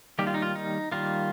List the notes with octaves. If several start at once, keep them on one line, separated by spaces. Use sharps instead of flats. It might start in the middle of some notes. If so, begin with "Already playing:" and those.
D#3 G3 A#3 G4
F4
D#4
F4
D#4
D#3 G3 A#3 F4